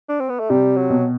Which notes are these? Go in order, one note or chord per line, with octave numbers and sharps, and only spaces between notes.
D4
C4
B3
A3
C3 G3
F#3
B2